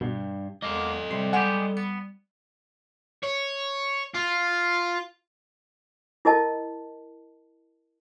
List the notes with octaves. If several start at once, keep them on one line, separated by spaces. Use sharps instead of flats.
G2 B2
E2 G#3 A#3 A4 D#5
C3 G3 C6
G#3 B3 G4 F#5 G#5 F6
B3 C#7
C#5
F4
E4 A#4 D#5 A5